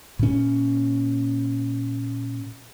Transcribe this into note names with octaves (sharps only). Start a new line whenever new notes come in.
A#2 C#4